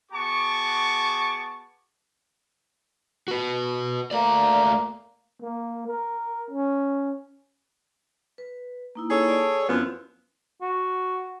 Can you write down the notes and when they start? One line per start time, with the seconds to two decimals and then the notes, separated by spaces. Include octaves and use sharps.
0.12 B3 F#4 G#4 A5 C#6 D6
3.28 F#4 B4
4.11 A3 A#3 D5
5.41 A#3
5.87 A#4
6.50 C#4
8.38 B4
8.95 A#3 D#4 E4
9.10 G#4 A4 C#5
9.29 D5 A5
9.68 F#2 F3 B3 C4 E4
10.62 F#4